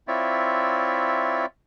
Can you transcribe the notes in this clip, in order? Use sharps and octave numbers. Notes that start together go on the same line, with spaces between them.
C4 E4 F4 C#5 D5 E5